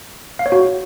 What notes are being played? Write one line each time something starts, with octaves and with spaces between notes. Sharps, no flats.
F5
C#5
F#4